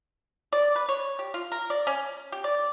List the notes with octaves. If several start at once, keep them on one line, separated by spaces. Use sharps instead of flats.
D5
B4
C#5
G4
F4
A#4
D5
C#4
G4
D5